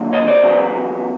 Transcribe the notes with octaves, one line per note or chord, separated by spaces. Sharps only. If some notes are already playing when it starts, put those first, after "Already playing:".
Already playing: D#2 D3 F#3 A#3
C#5 D#5
C5 D5
E2 C#3 F#3 B3